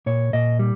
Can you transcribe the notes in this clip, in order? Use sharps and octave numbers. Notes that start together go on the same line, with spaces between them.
A#2 C#5
A#2 D#5
G3